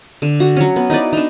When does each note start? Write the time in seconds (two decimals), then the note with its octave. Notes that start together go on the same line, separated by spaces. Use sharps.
0.22 D3
0.40 F#4
0.56 F#3 C#4
0.76 B3
0.90 D#4 E4 B4 D5
1.13 D4 D#4